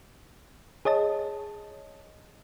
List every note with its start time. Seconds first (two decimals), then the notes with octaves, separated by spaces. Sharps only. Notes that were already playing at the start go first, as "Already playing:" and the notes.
0.85 G#4 C#5 D#5 A5